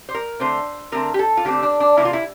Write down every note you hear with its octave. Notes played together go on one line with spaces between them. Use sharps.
C5
A#4
D3 A3 C4 C5
D3 A3 C4 A#4
G4
A4
F4
D3 A3 C4 G4
D4
D4
C3 E3 A#3 E4
F4
E4